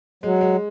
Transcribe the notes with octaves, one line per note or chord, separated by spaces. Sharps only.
F#3 G#3
G#3